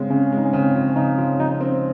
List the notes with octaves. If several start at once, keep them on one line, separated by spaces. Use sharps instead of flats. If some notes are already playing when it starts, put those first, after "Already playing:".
Already playing: C#3 G#3 C4
C#3 C#4
G#3 D#4
C#4
C#3 C4
F3 C#4
C#3 D#4
F3 F4
F3 D#4
C4 C#4